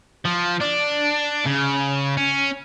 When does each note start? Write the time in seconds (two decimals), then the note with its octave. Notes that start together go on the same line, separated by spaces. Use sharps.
0.25 F3
0.60 D4
1.46 C#3
2.18 C#4